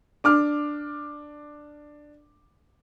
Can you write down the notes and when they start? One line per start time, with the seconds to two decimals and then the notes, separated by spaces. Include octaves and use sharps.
0.24 D4 D6 F6